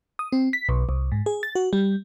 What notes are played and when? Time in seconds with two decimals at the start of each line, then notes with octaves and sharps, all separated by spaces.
0.19 D#6
0.32 C4
0.53 B6
0.69 B1
0.89 C2
1.12 G#2
1.26 G#4
1.43 A6
1.55 F#4
1.73 G3